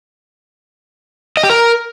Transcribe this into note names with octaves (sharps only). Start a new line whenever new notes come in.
D#5
G4
A#4